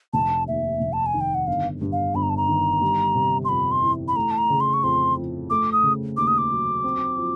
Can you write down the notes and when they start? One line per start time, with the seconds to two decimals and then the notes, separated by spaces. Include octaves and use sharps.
0.13 F1 A5
0.47 D#2 E5
0.80 F1
0.93 A5
1.06 G#5
1.14 D#3
1.21 G5
1.35 F#5
1.47 G1 F5
1.81 G2
1.92 F5
2.15 G1 B5
2.23 A#5
2.30 A5
2.37 A#5
2.48 D#3
2.81 G3
3.15 C3
3.45 C6
3.49 F2 B5
3.71 C6
3.83 E3
4.08 B5
4.16 A3 A#5
4.31 A5
4.38 A#5
4.50 C#3
4.61 C6
4.74 C#6
4.84 F2 C6
5.17 F3
5.50 A3 D6
5.72 D#6
5.83 C#3
6.16 D#2 D6
6.27 D#6
6.38 D6
6.51 F#3
6.84 C4
7.17 F3